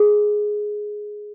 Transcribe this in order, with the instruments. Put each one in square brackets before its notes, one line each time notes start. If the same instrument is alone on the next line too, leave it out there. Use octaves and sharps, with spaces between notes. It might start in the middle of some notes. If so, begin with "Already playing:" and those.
Already playing: [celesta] G#4